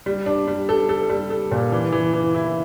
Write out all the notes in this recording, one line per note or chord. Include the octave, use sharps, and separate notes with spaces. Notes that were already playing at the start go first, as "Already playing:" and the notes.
G3
D4
G3
A4
A4
G3
A4
A#2
E3
E3
E3
E4